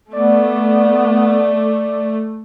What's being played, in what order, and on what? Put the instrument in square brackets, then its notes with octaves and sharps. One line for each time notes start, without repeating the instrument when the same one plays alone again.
[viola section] A3 [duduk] B3 [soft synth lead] D5